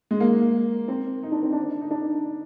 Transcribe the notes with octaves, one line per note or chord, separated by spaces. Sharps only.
G#3
A#3
C4
D#4
D4
C4
D4
D#4
D4